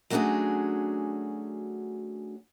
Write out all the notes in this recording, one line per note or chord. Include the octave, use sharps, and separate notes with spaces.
F#3 A3 C#4 D4 F#4 G#4